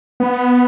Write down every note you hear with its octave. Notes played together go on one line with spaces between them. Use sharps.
B3